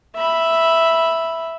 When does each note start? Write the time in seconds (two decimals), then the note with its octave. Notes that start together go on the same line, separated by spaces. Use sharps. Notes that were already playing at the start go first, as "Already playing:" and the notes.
0.16 E5 B5